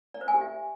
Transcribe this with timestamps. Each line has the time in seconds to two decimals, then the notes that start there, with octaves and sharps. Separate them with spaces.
0.14 D5
0.21 C5
0.28 G#5
0.35 G4
0.41 E5